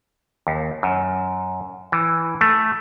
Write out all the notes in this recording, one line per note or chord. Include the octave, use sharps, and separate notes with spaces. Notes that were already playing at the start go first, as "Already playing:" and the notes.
D#2
F#2
E3
A3